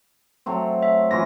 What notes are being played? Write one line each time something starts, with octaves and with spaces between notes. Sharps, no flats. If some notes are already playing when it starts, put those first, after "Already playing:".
F#3 A3 C4
E5
E3 C#4 F4 A#6